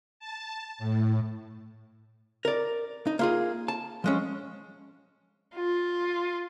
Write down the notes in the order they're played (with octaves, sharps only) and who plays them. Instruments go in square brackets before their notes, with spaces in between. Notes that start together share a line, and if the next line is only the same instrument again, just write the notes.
[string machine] A5
A2
[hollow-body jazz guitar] A#4 D5
D#4
A#3 F4 G#4
A5
F3 G#3 C#4
[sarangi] F4